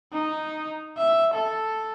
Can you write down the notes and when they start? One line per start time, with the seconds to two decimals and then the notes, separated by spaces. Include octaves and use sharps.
0.13 D#4
0.98 E5
1.34 A4